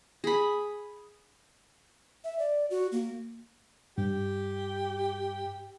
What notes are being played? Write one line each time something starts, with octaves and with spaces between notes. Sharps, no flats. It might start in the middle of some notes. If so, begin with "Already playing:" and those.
G#4 B5
E5
D5
F#4
A#3
G2 G4